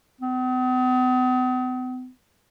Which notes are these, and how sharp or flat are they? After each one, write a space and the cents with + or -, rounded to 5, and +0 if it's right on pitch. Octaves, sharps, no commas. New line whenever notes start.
B3 +45